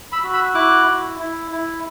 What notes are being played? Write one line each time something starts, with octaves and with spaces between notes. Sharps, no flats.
B5 E6
F#4
B5 E6
E4 D6 F#6
E4
E4
E4